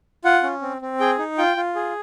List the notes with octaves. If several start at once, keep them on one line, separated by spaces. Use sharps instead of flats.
F4 F#5
C#4
C4
C4
G#4 G5
D#4
F4 G5
F4
G#4